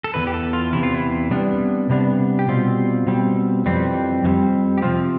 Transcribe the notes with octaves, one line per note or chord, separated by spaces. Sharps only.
A4
E2 C3 E3 B4
G4
A4
F4
E2 C3 E3 E4
F4
E4
C3 G3 B3 D4
C3 G3 B3 D4
G4
B2 G3 C4 F4
B2 G3 C4
F2 E3 G3 C4
F2 E3 G3 C4
G4
C3 F3 C4 F4